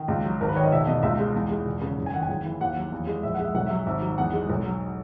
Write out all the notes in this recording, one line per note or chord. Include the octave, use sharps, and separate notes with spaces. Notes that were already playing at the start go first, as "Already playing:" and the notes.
Already playing: D#3
C#2
F#3
G#1 A#4
B4
D#3 C#5
D#5
E1 E5
B2 D#5
C#2 E5
G#3
E2
G#3
E1
C#3
F#1
G#5
D#3 F#5
G#5
F#1
E3
D#2 F#5
F#3
E2
G#3
A#1 E5
F#5
G#3
E5
B1 F#5
E5
F#3
G#1 E5
F#3
E2 F#5
G#3
B1
F#3